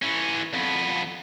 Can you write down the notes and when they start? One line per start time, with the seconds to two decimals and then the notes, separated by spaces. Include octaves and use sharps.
0.02 E3 C#4
0.53 F2 B3